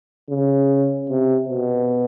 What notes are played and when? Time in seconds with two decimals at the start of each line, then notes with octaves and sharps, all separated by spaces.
0.30 C#3
1.09 C3
1.50 B2